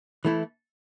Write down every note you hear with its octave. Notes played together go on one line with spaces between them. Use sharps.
E3 A3 E4